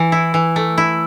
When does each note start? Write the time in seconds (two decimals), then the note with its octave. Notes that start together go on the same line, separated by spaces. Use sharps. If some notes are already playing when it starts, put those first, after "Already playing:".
Already playing: E3
0.12 E4
0.34 E3
0.56 A3
0.78 E4